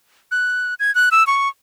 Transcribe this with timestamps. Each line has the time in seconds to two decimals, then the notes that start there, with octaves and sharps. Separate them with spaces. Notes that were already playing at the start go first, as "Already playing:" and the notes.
0.31 F#6
0.80 G#6
0.95 F#6
1.12 E6
1.27 C#6